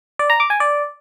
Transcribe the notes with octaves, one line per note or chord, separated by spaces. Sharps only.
D5
A#5
D6
G#5
D5